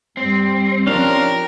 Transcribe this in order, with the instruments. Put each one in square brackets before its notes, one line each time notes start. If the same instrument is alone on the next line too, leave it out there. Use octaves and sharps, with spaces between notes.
[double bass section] G2 G3 [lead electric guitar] C4
[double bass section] F3 [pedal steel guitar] C#4 D4 F5 [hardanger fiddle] G4 A#4